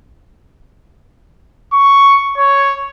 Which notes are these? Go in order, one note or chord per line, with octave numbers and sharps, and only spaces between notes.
C#6
C#5